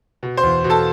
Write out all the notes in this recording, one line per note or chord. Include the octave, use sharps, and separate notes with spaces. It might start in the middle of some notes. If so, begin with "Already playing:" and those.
B2
C5 C6
E2
B2
A4 A5